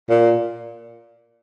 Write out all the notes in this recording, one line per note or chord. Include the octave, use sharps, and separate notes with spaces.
A#2